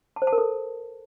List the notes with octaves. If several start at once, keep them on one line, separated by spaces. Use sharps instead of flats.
A5
C5
A5
A#4
A4